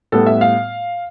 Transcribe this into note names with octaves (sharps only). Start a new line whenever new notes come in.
A2 G3 B3 A4
E5
F5